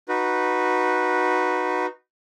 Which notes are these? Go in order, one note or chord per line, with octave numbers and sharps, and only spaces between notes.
D#4 F#4 B4